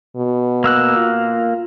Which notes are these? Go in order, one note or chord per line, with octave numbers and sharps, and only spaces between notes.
B2
A#3 E6 F#6
F4